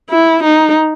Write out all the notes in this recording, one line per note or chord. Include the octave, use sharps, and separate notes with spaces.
E4
D#4